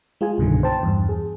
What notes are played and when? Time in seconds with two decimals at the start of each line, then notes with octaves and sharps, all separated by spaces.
0.21 G#3 F4 G#4 G#5
0.38 C2 G2 B2 D3 D#3
0.63 C5 G5 A5
0.83 E2 G2
1.09 G#4